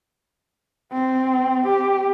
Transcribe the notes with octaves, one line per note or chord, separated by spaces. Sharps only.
C4
G4